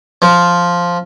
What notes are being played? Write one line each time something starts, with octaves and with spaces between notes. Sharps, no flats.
F3